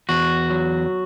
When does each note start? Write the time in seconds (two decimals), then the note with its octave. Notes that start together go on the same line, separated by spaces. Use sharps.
0.09 E2 F#4
0.50 F#3